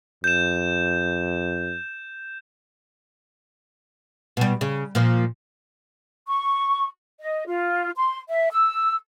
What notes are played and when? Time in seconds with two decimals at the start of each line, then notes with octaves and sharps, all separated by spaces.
0.24 F2 G6 E7
4.37 B2 G3
4.61 C#3
4.95 A#2 F3
6.27 C#6
7.21 D#5
7.47 F4
7.96 C6
8.29 E5
8.52 E6